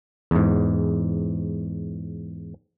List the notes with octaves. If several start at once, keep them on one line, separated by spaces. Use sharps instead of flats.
E2 G#2